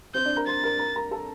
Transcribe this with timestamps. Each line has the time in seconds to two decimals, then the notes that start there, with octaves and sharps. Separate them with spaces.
0.14 C4 C5 G6
0.25 D4 D5
0.36 A#4 A#5
0.47 C5 C6 A6
0.64 A#4 A#5
0.79 A#4 A#5
0.96 A#4 A#5
1.11 A4 A5